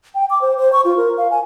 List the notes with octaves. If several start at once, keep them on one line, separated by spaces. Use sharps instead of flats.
G5
D6
C5
C5
C#6
F4
A#4
F5
G#5